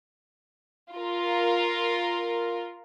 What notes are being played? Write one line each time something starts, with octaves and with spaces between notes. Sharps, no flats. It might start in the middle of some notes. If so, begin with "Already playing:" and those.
F4 A#4